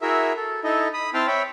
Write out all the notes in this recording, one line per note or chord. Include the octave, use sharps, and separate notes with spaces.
E4 F#4 G#4 A#4 E5
A4
D#4 E4 A4 D#5
B5 D#6
C4 E4 G5 A5 C6 F6
C#5 E5 G5 B5